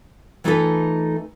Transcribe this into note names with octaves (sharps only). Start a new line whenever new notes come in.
E3 A3 D#4 F4 A4 B4